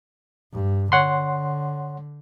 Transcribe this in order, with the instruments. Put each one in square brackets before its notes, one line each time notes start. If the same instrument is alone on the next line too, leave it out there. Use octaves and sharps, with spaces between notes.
[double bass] G2
[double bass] D3 [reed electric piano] C#5 F#5 C6